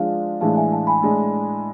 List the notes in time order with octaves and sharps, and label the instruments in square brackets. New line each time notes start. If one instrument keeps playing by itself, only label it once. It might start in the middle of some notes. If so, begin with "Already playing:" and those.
Already playing: [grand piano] F3 G#3 D4 [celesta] D5 F5
[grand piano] A2 E3 G#3 D4 [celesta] F5 A5
[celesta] E5 G#5
F5 A5
G#5 B5
[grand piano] A2 G#3 D4